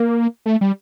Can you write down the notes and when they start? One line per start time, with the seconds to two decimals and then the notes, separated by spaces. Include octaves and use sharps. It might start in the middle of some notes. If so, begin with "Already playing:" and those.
Already playing: A#3
0.46 A3
0.61 G3